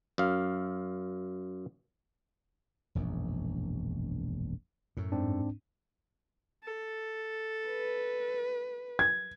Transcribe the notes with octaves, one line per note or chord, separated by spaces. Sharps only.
F#2 F5
E1 A#1 F#2
F#2 A2
G#2 C4 D4
A4
B4
G#6